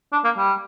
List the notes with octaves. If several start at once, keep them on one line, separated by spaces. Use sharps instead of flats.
D4
A#3
G3